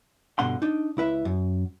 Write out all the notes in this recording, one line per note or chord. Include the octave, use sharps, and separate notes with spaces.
G2 B2 D3 F#5 C6
D4 D#4
C#2 E4 B4 E5
F#2